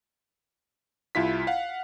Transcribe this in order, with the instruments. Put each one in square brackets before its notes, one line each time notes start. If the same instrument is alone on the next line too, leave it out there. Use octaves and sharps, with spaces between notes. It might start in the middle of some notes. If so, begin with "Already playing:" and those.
[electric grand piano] C2 E4 F4 B6
F5 F#5